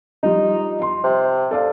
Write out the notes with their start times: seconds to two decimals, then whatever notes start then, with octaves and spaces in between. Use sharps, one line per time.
0.23 F3 G3 D#4 F4
0.80 D#5 C6
1.04 C3
1.51 A4 D5 F5